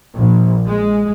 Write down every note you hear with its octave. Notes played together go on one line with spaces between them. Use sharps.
A#1
G#3